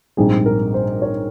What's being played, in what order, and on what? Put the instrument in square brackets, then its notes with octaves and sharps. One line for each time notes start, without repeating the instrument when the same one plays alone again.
[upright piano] A#1 G#2 G3 C4 G#4
A#4
C5
C#5